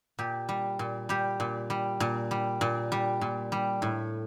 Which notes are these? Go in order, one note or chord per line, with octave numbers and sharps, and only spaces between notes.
A#2 G4
G3
A#2
G3 G4
A#2
G3
A#2
G3
A#2
G3
A#2
G3
A2